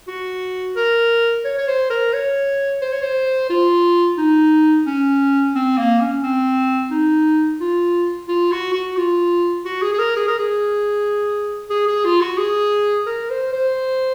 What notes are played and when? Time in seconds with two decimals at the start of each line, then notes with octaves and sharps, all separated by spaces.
0.08 F#4
0.76 A#4
1.45 C#5
1.58 C#5
1.68 C5
1.90 A#4
2.13 C#5
2.82 C5
2.92 C#5
3.02 C5
3.50 F4
4.18 D#4
4.87 C#4
5.55 C4
5.78 A#3
6.01 C#4
6.23 C4
6.91 D#4
7.61 F4
8.28 F4
8.52 F#4
8.73 F#4
8.97 F4
9.65 F#4
9.82 G#4
9.93 G#4
9.99 A#4
10.17 G#4
10.27 A#4
10.39 G#4
11.70 G#4
11.87 G#4
12.05 F4
12.21 F#4
12.38 G#4
13.06 A#4
13.30 C5
13.53 C5